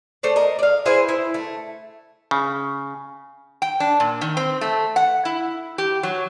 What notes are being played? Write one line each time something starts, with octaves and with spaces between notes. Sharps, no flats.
A3 C5 D5
A#4 D#5
D5 F5
E4 G#4 B4 C5
E4
A3
C#3
G5
D4
A#2
D#3
C4
A3
F#5
E4
G4
F#3